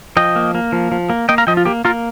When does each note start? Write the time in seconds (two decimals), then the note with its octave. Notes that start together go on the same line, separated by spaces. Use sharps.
0.17 F3 D#5 G5
0.36 A#3
0.55 A#3
0.72 F3
0.92 F3
1.10 A#3
1.29 A#3 D#5 G5
1.38 F5 A#5
1.47 F3 D#5 G5
1.57 F4
1.65 A#3 G4
1.85 A#3 F4 A#4